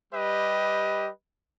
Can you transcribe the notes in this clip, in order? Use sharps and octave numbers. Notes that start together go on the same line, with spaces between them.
G3 G4 B4 D#5